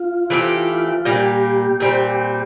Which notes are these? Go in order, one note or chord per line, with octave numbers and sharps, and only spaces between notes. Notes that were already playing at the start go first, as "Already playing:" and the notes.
Already playing: F4
E3 A3 C4 G4
A#2 G3 A#3 G4
A#2 G3 C4